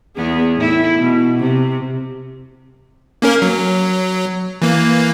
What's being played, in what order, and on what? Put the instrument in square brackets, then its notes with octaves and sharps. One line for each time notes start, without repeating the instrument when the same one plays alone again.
[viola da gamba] E2 B3 G#4
A2 E4
B2
C3
[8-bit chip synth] A#3 C#4 A#4
F#3
E3 A#3